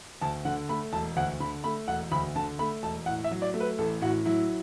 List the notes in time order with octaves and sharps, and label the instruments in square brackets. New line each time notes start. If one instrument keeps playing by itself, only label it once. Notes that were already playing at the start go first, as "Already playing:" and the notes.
[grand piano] D2 A5
D3 F#5
A3 B5
E1 A5
D2 F#5
D3 B5
A3 B5
E1 F#5
D2 B5
D3 A5
A3 B5
E1 A5
A2 F#5
E5
F#3
D5
A3
B4
A1 A4
A2 F#4
F#3 E4